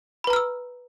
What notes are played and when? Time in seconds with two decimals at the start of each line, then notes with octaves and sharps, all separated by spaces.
0.24 B5
0.27 B4
0.30 A#5
0.33 F6
0.36 E6